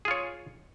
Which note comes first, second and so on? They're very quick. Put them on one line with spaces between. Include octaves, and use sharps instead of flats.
G#4 F4 C#5